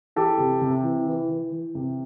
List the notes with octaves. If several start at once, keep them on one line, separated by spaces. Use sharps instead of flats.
E3 G4 A4
C3
C3
E3
E3
E3
E3
C3